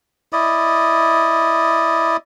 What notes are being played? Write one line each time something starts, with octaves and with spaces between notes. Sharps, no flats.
E4 D5 D#5